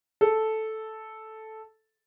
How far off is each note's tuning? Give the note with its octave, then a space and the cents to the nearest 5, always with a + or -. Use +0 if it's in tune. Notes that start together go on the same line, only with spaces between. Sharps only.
A4 -5